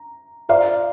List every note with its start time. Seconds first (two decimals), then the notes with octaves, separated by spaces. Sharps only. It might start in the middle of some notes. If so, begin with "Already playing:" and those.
Already playing: A#5
0.49 F4 C5 D5 F5 A#5 D6